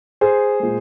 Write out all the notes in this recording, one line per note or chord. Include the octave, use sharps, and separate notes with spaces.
G#4 C5
A#2 G#3